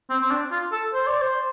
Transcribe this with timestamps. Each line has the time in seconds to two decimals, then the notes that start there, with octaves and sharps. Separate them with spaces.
0.10 C4
0.21 C4
0.30 D4
0.51 F4
0.72 A4
0.94 C5
1.07 D5
1.21 C5